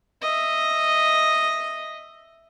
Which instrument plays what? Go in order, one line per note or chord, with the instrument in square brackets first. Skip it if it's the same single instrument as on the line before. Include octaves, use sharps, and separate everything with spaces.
[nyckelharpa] D#5 E5